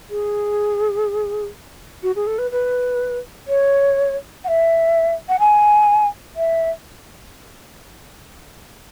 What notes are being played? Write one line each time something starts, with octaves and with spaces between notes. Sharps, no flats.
G#4
F#4
G#4
A4
B4
B4
C#5
F#5
E5
F#5
G#5
E5